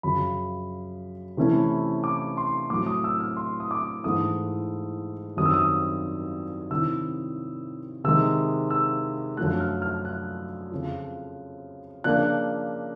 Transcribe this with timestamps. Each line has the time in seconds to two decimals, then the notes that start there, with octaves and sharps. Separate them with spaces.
0.03 F#2 C#3 F3 B5
1.37 C3 E3 A3 C#4 E4
2.04 D6
2.37 C6
2.70 A2 F#3 A3 C4 D6
2.86 D#6
3.04 E6
3.20 F6
3.36 C6
3.60 D#6
3.71 D6
4.04 G#2 E3 A3 D#6
5.37 F#2 D#3 G3 C4 D#6
5.45 E6
5.54 D#6
6.70 C3 D#3 G3 C4 E4 E6
8.04 C3 D#3 G#3 E6
8.70 E6
9.37 F#2 D3 F3 A3 F#6
9.60 F6
9.82 F6
10.05 F#6
10.71 F2 C#3 F3
12.04 C#3 F3 A#3 D4 F#6